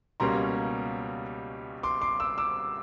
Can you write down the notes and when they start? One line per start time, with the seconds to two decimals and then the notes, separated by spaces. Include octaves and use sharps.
0.20 C#2 B2 G3 A#3 C#4 A#5 C6
1.83 C6 D6
2.02 C6 D6
2.20 D6 E6
2.38 D6 E6